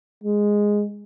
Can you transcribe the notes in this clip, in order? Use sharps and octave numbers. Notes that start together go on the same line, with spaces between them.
G#3